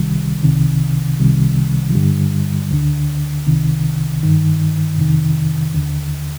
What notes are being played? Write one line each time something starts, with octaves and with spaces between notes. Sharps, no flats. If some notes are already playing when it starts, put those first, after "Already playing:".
Already playing: C2 C3 D#3 G3
C2 C3 D#3
C2 C3 D#3 G3
F3
G2 D3 G3
D2 D3
C2 C3 D#3
G2 D#3
F2 C3 D#3
D#2 D3